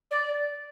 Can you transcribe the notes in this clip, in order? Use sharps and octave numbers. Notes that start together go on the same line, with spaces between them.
D5